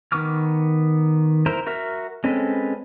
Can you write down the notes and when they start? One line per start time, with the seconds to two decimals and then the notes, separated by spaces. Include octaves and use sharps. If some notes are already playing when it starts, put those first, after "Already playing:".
0.12 D#3 B3 C#6 D6 F6
1.46 E4 A#4 C5
1.67 F#4 A#4 E5 F6
2.24 G#3 C4 C#4 A4 B4